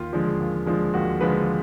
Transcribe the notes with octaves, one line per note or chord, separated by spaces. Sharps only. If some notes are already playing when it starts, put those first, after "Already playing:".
Already playing: D#2 F4
D3 F3 G#3
D#2
D3 F3 G#3
D#2 F#4
D3 F3 G#3 B4